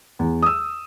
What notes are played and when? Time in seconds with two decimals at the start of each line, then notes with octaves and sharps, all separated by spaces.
0.19 E2
0.43 D#6 E6